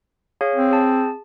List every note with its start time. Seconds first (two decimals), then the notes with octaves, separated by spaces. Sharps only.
0.41 G#4 C#5 F5
0.56 C4
0.71 G#4 A5